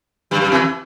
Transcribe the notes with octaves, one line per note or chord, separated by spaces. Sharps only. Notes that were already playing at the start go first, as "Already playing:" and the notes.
G2 G3
G2 G3
E2 E3